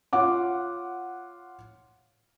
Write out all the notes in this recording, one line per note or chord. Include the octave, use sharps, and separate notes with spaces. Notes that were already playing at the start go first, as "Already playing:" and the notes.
F4 C#5 F#5 D6